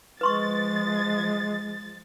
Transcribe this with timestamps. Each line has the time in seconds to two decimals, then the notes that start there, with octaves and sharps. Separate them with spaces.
0.21 F3 G#3 B4 C6 C#6 A6